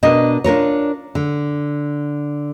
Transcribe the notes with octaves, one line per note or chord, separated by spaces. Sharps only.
B2 D4 A#4 D#5
D4 F4 A#4 C#5
D3